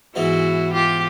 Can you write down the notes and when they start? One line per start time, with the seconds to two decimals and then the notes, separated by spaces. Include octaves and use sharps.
0.15 G#2 E3 G#3 B3 E4 F#4
0.73 F4 G4